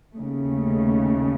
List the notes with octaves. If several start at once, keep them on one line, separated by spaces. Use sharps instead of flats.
D#2 C#3 A3